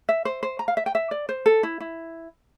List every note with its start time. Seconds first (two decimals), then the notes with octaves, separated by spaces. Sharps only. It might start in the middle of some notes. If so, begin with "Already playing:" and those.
0.09 E5
0.25 C5
0.43 C5
0.59 A#5
0.68 F5
0.77 E5
0.86 G5
0.95 E5
1.11 D5
1.29 C5
1.46 A4
1.63 E4
1.80 E4